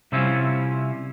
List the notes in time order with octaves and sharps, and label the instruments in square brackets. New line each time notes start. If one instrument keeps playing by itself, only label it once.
[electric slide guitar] C3 G3 C4 C#4 E4 F4